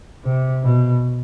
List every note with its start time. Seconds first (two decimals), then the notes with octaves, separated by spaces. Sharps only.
0.23 C3
0.62 B2